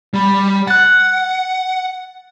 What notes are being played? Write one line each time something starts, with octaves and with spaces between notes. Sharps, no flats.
G3 B5
F#5 F#6 A6